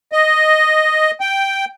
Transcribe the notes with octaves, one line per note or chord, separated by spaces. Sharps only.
D#5
G5